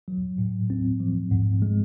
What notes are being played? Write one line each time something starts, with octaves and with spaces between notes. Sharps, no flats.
F#3
A2
C4
F3
G#2
G#3